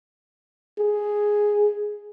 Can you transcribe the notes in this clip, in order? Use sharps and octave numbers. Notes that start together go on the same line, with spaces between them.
G#4